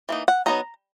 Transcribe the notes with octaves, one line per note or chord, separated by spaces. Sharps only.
E3 A#3 D#4
F#5
F#3 B3 D#4 A#5